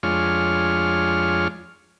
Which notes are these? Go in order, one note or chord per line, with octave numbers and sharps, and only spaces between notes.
F2 G#3 D4 F4 C#5 F6